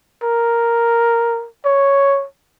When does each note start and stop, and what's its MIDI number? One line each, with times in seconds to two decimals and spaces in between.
0.23 1.47 70
1.65 2.25 73